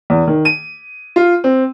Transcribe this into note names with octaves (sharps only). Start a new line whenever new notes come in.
E2
D#3
D#7
F4
C4